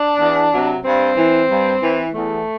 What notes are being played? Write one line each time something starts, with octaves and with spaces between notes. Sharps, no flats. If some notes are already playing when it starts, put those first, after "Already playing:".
Already playing: D4
E2
C3 F#3
G2 C4
E3
G2
E3
E2 A3